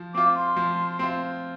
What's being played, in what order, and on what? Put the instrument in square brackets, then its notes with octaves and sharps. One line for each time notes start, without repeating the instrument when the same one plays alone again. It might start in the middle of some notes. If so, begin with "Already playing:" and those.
Already playing: [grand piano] F3
[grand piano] C4 F4 [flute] D6
[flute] C6
[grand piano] F3
C4 F4